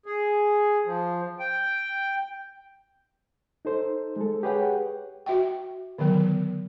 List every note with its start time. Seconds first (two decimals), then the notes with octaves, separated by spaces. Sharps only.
0.06 G#4
0.85 F3
1.39 G5
3.65 D#4 A4 C5
4.16 G#3 A4
4.43 G4 G#4 B4 C#5 F#5 G5
5.26 F#4 E5 G5
5.98 D3 D#3 F#3 B3